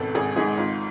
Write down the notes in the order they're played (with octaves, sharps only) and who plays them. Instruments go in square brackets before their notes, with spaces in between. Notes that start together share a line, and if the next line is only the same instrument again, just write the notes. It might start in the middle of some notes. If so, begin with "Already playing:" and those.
Already playing: [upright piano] G#1 C#2 B2 A4
G#1 G#4
G#2 G#4
G#1 F4